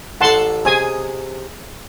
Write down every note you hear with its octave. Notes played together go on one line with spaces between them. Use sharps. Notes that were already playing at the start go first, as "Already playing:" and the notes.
A1 A4 F#5 A5 C6
C3 G#4 G#5 D#6